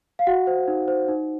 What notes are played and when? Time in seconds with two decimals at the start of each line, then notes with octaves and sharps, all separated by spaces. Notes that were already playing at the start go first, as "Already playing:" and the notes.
0.19 F5
0.27 F#4 F#5
0.47 C5
0.68 D#4
0.88 C5
1.08 D#4